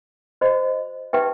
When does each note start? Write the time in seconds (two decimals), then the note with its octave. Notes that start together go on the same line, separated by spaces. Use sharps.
0.41 F#4 C5 D#5
1.13 D#4 G4 B4 E5 G5